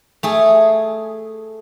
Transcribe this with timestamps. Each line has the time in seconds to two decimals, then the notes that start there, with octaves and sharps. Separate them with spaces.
0.23 A3 G#4